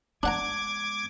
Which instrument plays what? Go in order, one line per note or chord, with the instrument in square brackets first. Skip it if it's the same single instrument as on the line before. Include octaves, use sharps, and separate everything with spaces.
[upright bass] G#3 B3 [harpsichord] D4 F#5 A#5 [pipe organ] D6 G#6